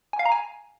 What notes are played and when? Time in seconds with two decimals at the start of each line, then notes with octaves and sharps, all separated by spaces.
0.13 G#5
0.19 F5
0.25 A#5
0.32 G#5